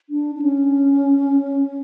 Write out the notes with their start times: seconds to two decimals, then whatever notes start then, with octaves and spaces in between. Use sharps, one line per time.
0.10 D4
0.35 D4
0.42 C#4